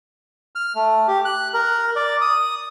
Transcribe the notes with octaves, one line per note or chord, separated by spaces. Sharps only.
F6
A3
G4
F#6
A#4
D5
D#6